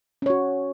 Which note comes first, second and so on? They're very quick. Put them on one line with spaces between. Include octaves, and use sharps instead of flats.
C#4 C#5 F#4